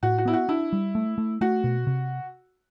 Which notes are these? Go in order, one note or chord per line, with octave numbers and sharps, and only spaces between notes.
A2 F#4
F#4
B3 E4
F#4
D4 E4
G3
A3
A3
A3 F#4
B2
C3